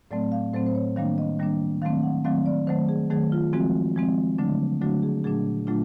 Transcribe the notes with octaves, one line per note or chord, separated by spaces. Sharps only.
A2 F#3 A3 C4 D5
F5
A2 F#3 A3 C4 C5
C5
C#5
D#3 G3 A#3 D4 F5
D#5
D#3 G3 A#3 D4
D#3 F#3 A3 C4 F5
F#5
D#3 F#3 A3 C4 F5
D5
D#3 F#3 A3 C5
G#4
D#3 F#3 A3 G#4
F4
F3 G#3 C4 F#4
F3 G#3 C4
D3 F#3 A3 D4
D3 F#3 A3 D4 F#4
G#4
A#2 F#3 A3 D4 G#4
A#2 F#3 A3 D4 F4